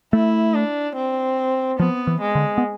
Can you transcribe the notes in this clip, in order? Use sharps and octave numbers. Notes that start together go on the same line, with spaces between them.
A3 E4
D4
C4
F3 B3
E3
G#3
D3
B3